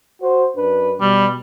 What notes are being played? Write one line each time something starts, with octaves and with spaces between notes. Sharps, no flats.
F#4 C5
F#2 D4 B4
B2 G3